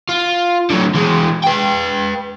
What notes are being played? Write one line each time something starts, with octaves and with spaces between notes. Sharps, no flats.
F4
D3 F#3
E3 G#3
B4 G5